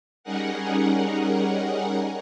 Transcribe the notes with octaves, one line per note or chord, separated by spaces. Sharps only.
G3 C#4 D#4 G#4 A#4 F#5